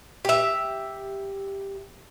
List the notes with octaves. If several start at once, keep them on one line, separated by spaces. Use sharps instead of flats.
G4 E5